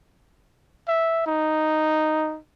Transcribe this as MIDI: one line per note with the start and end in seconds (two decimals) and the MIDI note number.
0.88 1.24 76
1.26 2.39 63